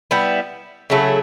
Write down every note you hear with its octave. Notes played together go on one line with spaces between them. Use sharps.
G3 B3 E4
C#3 F#3 A3 E4